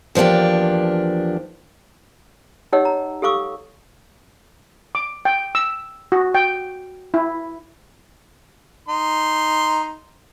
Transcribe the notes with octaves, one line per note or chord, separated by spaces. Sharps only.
E2 F3 A#3 D4 G4
D#4 G4 C#5 D#5 F#5 E6
A#5
G4 A4 F5 C#6 D6 E6
D6
G5
E6
F#4
G5
E4
D#4 C6